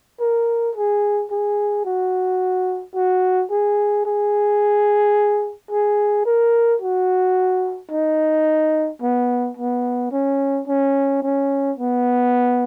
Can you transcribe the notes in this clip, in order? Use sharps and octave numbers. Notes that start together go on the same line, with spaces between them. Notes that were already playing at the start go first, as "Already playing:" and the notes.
A#4
G#4
G#4
F#4
F#4
G#4
G#4
G#4
A#4
F#4
D#4
B3
B3
C#4
C#4
C#4
B3